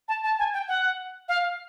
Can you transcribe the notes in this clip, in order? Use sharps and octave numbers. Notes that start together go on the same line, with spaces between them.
A5
A5
G#5
G5
F#5
F5